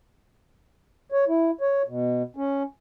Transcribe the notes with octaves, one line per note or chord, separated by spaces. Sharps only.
C#5
E4
C#5
B2
C#4